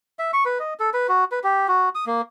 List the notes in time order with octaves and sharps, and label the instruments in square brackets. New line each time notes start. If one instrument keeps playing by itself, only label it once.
[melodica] E5
C#6
B4
D#5
A4
B4
F#4
B4
G4
F#4
D#6
A#3